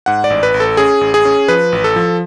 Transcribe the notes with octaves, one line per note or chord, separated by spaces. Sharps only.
G#2 F#5
D5
A1
B4
A1
A4
C#4 G#4
A1
G#4
C#4
F3 B4
A1
A4
F3